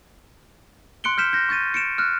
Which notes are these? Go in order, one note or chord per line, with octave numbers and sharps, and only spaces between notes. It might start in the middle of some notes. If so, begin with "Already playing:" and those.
C6 F#6 C#7 D7 G7
F6 G6 B6 E7
G6 A#6
C#6 G6 A6 D#7
C#7 D7 E7
F6 F#6